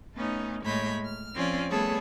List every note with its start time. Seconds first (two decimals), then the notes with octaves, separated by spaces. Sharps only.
0.14 A3 B3 C#4 D#4
0.63 A2 G#3 A#3 C#5 B5 G6
1.05 F6
1.34 F3 C4 C#4 F4 D5
1.70 G3 A3 B3 G#4 A4 C#5